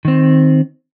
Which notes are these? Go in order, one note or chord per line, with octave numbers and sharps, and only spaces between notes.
D#3 C4